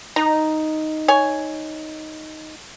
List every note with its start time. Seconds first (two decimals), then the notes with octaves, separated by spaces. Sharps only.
0.16 D#4 A#5
1.08 C#5 G#5